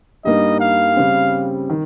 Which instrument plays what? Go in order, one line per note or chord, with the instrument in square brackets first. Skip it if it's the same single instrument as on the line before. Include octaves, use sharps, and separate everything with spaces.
[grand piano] G2 G3 A#3 D#4 [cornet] D#5
[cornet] F5
[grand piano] C#3 G3 C4
D#3